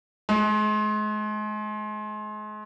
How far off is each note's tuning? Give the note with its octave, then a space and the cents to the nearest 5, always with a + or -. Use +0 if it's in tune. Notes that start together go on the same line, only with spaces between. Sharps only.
G#3 +35